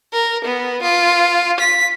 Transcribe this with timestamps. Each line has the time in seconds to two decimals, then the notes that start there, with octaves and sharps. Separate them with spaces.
0.13 A#4
0.45 B3
0.83 F4
1.60 B6